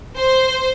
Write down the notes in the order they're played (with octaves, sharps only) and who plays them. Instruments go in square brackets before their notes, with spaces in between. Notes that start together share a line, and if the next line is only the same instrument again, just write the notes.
[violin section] C5